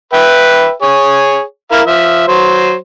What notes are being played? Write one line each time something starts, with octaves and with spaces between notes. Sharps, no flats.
B4 E5 G5
G#4 C#5
E4 A#4 F5
F3 E5
F#3 C5